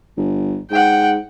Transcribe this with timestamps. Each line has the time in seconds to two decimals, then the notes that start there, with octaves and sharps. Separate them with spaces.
0.17 G1
0.70 G#2 F#5 G5